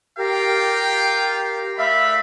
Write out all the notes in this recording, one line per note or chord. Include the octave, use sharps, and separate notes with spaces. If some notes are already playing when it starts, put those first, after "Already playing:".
F4 G4 A#4 F5 G5
A3 D5 E5 F5 B5